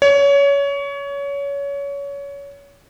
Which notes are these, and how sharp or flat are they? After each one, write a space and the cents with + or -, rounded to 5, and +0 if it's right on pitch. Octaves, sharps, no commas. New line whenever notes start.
C#5 +25